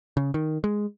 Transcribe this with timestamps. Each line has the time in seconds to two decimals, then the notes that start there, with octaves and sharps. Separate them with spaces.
0.17 C#3
0.34 D#3
0.64 G#3